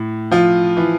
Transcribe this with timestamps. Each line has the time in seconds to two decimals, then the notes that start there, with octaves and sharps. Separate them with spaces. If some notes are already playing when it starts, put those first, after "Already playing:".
Already playing: A2
0.31 F3 F4
0.77 E3